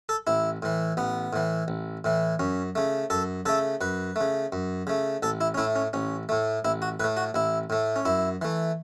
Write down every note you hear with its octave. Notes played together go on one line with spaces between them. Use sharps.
A4
A1 E4
A2 E3
A1 B3
A2 E3
A1
A2 E3
F#2 C#4
C#3 A3
F#2 A4
C#3 A3 A4
F#2 B4
C#3 A3
F#2
C#3 A3
A1 A4
E4
C#4
A2 A3 E4
C#4
A1 C#4
A2 A3
A1 E4
F#4
A2 A3 B4
F#4
A1 E4
A2 A3
C#4
F#2 E4
E3 A3